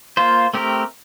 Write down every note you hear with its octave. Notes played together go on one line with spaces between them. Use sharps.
A#3 F4 C5
A3 C4 G4 A#4